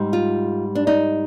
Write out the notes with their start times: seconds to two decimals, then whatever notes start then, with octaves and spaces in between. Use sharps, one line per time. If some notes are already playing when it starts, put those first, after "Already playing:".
Already playing: G#2 G3
0.13 F4
0.75 D4
0.87 D#4